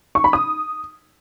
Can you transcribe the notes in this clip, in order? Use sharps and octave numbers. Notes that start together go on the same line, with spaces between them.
C#6
B5
D#6